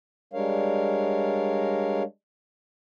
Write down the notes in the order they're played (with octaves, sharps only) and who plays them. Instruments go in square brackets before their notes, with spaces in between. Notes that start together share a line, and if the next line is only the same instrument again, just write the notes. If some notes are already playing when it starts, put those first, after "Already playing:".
[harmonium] G3 G#3 D4 A#4 C#5 F5